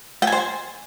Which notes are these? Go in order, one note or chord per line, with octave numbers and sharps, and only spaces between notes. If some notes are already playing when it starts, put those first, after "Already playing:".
G5
G#5
C5
G#5